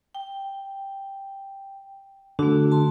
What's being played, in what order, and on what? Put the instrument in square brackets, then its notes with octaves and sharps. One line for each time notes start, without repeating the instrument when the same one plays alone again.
[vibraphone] G5
[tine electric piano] D3 [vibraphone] A3 F#4
[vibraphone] A5 C6